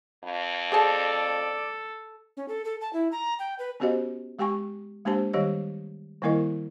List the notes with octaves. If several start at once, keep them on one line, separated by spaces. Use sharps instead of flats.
F2
G#4 A4 C5 D5 A5
C#4
A4
A4
A5
E4
A#5
G5
B4
B3 C#4 F#4 G4 C5 D#5
G#3 G4 G5 G#5 C#6
G#3 A#3 D4 G4 C5 A5
D#3 G3 G4 C#5 D#5
D#3 G3 A#3 E4 A#4 D#5